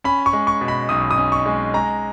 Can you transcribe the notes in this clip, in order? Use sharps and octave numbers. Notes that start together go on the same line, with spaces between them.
C#4 B5
C#6
G#3
C#6
B2
B5
B1 D#6
D#6
C#4
C#6
G#3
G#3 A#5